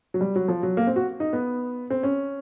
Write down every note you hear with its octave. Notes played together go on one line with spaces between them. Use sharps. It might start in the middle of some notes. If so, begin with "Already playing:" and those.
F#3
G3
F#3
F3
F#3
A#3
C4
F#4
D#4
B3
C4
C#4